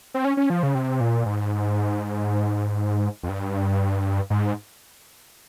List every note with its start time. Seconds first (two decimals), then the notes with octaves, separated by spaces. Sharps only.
0.14 C4
0.25 C#4
0.37 C#4
0.50 F3
0.63 C#3
0.75 C3
1.01 A#2
1.26 G#2
3.23 F2
3.29 G2
4.30 G#2